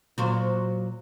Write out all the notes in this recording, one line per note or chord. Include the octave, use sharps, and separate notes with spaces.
A#2 F#3 C5